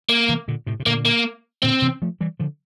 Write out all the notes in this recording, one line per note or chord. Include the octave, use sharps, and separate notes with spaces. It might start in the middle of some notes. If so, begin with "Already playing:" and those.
A#3
C3 E3
A#2 D3
A2 C3
C3
A#2 D3 A#3
A#3
A#2 D3 C4
C3 E3
F3 A3
E3 G3
D3 F3